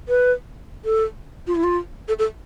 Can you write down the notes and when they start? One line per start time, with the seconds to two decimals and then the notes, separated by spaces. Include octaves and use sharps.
0.09 B4
0.85 A4
1.47 F4
1.55 E4
1.64 F4
2.08 A4
2.19 A4